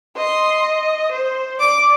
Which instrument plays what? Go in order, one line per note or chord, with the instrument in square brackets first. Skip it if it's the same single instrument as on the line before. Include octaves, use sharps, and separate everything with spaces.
[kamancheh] D#5 [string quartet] C6
[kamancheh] C5
[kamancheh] D5 [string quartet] D6